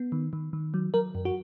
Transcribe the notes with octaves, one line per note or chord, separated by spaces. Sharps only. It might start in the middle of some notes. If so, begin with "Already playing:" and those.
Already playing: B3
D#3
D#3
D#3
F#3
F#3 A#4
F#2
F#4